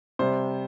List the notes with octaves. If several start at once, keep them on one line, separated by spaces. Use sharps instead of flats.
C3 G3 C5